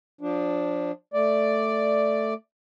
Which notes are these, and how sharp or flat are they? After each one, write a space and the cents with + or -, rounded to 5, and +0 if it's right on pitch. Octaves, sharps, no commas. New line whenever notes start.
F3 +25 D4 +0
A3 +0 D5 +0